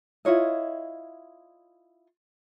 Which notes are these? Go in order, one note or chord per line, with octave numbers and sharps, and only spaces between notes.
E4 F4 C#5 D#5